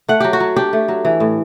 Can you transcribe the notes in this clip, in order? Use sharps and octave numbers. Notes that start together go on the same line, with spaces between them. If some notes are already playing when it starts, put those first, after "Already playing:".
A3 F#5
F#3 G4
F#4
F#3
D4 G4
A3
F#3
E3
A2